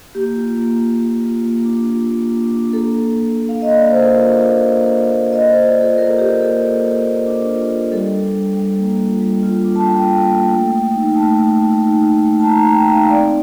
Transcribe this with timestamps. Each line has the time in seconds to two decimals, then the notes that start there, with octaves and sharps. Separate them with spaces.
0.15 A#3 G4
0.36 F4
0.58 A#3
0.79 A#3
1.01 F4
1.23 F4
1.44 A#3
1.65 D4
1.87 F4
2.09 A#3
2.30 D4
2.52 D4
2.73 A#3 A4
2.95 D4
3.17 A#3
3.38 A#3
3.49 F5
3.60 A#3 D#5
3.76 D5
3.82 A#3
3.90 C5
4.03 F4 A#4
4.25 D4
4.46 A#3
4.68 A#3
4.90 D4
5.12 A#3
5.33 A#3 D#5
5.49 C5
5.54 F4
5.65 D5
5.76 F4 A4
5.97 A#3 A#4
6.19 A#3 G4
6.40 A#3 A4
6.62 A#3
6.83 F4
7.05 A#3
7.27 D4
7.48 F4
7.70 D4
7.92 G3 A4
8.13 D4
8.35 G3
8.57 G3
8.78 A#3
9.00 F4
9.21 G3
9.43 F4
9.64 D4
9.76 A5
9.86 F4 G5
10.08 D4
10.29 A#3
10.51 A3
10.72 A3
10.94 D#4
11.15 A3 A5
11.37 A3
11.59 A3
11.80 D#4
12.02 D#4
12.24 A3
12.40 A5
12.45 D#4 A#5
12.67 D#4 G5
12.88 D#4 F5
13.10 C4 D5